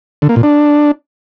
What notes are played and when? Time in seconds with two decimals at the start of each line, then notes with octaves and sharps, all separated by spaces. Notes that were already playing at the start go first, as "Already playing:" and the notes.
0.22 D3
0.29 A#3
0.36 A#2
0.43 D4